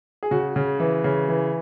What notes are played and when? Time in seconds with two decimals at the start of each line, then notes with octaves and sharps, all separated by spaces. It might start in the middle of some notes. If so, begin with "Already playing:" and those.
0.23 G#4
0.31 C#3 F#4
0.56 C#3
0.80 E3
1.04 C#3
1.28 E3